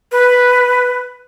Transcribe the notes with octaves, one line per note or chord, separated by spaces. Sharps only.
B4